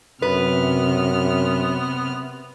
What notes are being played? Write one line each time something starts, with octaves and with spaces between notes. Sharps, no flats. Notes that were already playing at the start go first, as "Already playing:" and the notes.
F#2 C3 B3 B4 F6